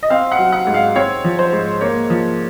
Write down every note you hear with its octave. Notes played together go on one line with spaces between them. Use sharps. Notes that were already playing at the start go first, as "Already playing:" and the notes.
D#5
C4 F5
F#5
F#3
F#5
G#2
F5
C4 C#5
F3
C5
G#2
A#3 C#5
F3